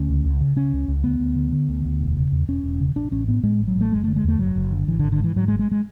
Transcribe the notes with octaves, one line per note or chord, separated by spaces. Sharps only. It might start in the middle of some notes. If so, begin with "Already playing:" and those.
Already playing: D2 C#4
C#2
C#2
C#3
C#3 C#4
C#2
C#2
D2 B3
D2
D3
D3
D2
D2
E1
C#3
E2
E1 C#4
E1
C#3
A1 D4
A1 C#4
A2 B3
A2 G#3
A1
F#3
A1 A3
F#1 G#3
A3
D3
G#3
E2 A3
F#1 F#3
F#1
D3
G#1 E3
D3
G#1
D3
G#2 E3
G#2 F#3
G#3
G#1
G#3
G#3